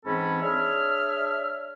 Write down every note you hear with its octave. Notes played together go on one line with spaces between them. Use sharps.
G#2 E3 C4 C#4 A4 B5
D4 G#4 C#5 E5 F6